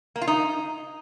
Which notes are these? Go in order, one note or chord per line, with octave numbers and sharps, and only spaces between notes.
A#3
F4
D#4